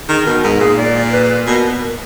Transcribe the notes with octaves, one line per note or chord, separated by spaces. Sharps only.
D#3 G#4
B2 A#4
G#2 A#4
A#2 G#4
D5
B4
B2 A#4